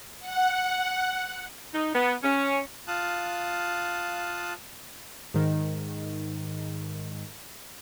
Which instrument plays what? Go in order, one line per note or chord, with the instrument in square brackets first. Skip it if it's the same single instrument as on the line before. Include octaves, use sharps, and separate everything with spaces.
[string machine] F#5
[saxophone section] D#4
B3
C#4
[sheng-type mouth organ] F4 F5 A5 D#6 F#6
[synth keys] G#2 D#3